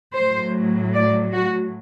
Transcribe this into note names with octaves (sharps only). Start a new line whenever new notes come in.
A2 F#3 C5
D5
F#4